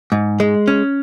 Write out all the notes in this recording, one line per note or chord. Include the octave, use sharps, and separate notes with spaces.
G#2
G#3
C#4